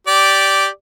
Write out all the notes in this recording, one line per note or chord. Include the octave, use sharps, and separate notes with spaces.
G4 D5